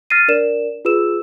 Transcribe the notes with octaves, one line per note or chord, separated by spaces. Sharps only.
F6 A6 A#6 C7 D#7
D4 A#4 D5 E7
F4 G#4 B4 E6 E7